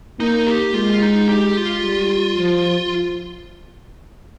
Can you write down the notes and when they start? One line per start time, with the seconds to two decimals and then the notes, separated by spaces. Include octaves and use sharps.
0.20 A#3 D#4
0.47 G4
0.74 G#3 F4
1.02 D#4
1.29 G4
1.57 F4
1.84 G3
2.38 F3